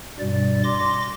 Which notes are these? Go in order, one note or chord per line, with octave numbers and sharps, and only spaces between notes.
G2 B2 G3 D5
C6 D6 A#6